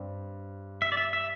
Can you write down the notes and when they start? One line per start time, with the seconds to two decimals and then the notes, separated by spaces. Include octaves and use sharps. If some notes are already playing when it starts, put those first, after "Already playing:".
Already playing: G2 G3 C4
0.82 E5
0.92 D5
0.97 E5
1.13 E5